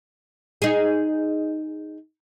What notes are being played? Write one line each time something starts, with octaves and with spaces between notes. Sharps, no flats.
D#4 G#4